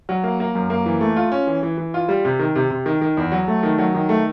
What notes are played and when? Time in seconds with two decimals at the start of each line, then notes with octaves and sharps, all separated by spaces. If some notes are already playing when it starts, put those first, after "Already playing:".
0.09 F#3
0.24 A#3
0.40 A#3
0.55 F#2
0.70 A#3
0.86 E3
1.01 A3
1.16 F4
1.32 C#4
1.47 E3
1.63 E3
1.78 E3
1.94 F4
2.09 G3
2.25 C3
2.39 D#3
2.55 C3
2.70 C3
2.86 D#3
3.01 D#3
3.17 E2
3.32 F#3
3.48 A3
3.63 D#3
3.78 F#3
3.94 D#3
4.09 A3